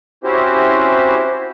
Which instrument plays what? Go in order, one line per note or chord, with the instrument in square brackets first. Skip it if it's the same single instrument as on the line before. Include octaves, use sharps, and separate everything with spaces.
[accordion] C4 C#4 E4 F#4 G4 C5